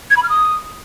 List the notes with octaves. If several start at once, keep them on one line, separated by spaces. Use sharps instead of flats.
G#6
B5
F6
D#6